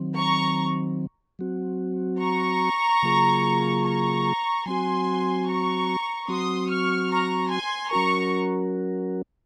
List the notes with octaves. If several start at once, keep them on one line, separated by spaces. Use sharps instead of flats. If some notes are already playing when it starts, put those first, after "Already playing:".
Already playing: D#3 F#3 C4
A#5 C#6
F#3 C4 F#4
A#5 C#6
C#3 F#3 A#3 F4 G#4
A#5 C#6
F#3 C4 F#4 G#5 C6
A#5 C#6
F#3 C4 F#4 C6 D#6
C#6 F6
A#5 C#6
G#5 C6
F#3 C#4 F#4 A#4 A#5 C#6